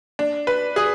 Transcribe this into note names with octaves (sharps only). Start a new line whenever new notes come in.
D4
B4
G#4